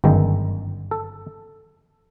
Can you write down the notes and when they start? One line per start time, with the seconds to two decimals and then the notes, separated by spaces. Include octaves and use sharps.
0.04 G1 F#2 D#3 G#3
0.91 A4